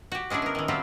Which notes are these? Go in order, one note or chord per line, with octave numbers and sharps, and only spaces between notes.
F#4 G4
G#3 C#4 D4 E4 G#4
B3 A#4
D#3 E3
F#3 G3 A3 C4 F4 G4